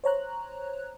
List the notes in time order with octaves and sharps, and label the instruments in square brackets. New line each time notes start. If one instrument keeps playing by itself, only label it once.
[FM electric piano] C5 C#5 A#5 F#6